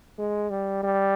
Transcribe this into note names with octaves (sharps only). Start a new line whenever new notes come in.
G#3
G3
G3